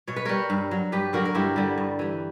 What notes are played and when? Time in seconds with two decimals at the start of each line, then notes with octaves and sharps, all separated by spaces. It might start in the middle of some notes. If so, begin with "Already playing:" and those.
0.08 B2 C#5
0.16 B4
0.25 G3 A#4 C#5
0.50 G2
0.71 F#3
0.92 G2 G4 B4
1.13 D3 F#3 F#4 A#4
1.25 A#4
1.35 G2 E4 G4
1.56 D3 G3
1.78 G2
1.99 E3 G3